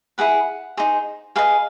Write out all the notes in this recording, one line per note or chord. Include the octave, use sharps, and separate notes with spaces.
E4 G#4 B4 F#5
D#4 G#4 C5
G#4 B4 D#5 F5